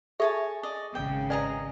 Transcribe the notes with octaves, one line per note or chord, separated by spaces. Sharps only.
G#4 A4 C#5 E5 G#5 A5
D5 D#5
G#1 C#3 G5
G#4 B4 D5 D#5 G#5 A#5